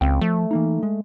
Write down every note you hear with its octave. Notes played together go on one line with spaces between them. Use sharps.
C#2 C4 F5 G5
F3 A3
E3 A#3 D#4
G#3